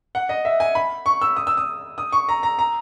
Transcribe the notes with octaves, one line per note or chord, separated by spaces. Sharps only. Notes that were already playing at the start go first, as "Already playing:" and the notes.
F#5
D#5
E5
G#5
B5
C#6
E6
D#6
E6
D#6
D#6
C#6
A#5
A#5
A#5